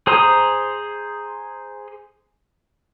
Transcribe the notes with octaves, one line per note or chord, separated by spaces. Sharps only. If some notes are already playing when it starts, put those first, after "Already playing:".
G#4 C5 A#5 C6 D#6